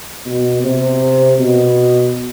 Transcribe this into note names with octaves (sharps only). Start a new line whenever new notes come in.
B2
C3
B2